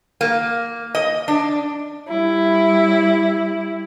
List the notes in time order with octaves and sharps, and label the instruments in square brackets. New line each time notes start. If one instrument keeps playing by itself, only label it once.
[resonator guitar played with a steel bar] A#3
D#5
D4
[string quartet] G3 E4